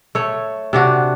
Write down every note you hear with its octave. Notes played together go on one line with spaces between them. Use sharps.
A3 C#5
C3 D4 F#4